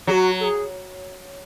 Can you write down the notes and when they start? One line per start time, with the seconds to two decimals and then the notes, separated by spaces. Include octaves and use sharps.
0.07 F#3 G#4
0.12 F#4
0.40 A4
0.44 G#4